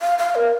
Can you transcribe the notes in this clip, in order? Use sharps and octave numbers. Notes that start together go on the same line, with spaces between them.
F5
F5
A#4